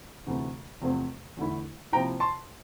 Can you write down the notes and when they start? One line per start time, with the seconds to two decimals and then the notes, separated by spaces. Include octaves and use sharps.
0.26 D2 C3 E3 A3
0.82 E2 C3 F3 A3 C4
1.37 E2 D3 A3 E4
1.92 C3 F3 A#3 E4 G5 A#5
2.20 A5 C6